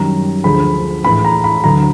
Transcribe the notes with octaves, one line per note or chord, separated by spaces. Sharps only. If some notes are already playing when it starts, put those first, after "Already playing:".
Already playing: F#2 D#3 G3 A#5
D2 D3 F3 G#3 B5
A2 E3 G#3 B5
A#5
B5
D2 D3 F#3 A#5